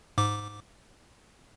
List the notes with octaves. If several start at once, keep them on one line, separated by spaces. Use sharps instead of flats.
G#2 D6